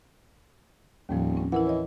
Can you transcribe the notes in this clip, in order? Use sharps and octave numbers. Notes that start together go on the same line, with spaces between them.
D#1 D#2 A2 F3
C4 C#4
E3 E4 A#4 F#5
C#5 D#5